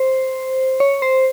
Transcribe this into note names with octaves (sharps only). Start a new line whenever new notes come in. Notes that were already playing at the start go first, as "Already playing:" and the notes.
Already playing: C5
C#5
C5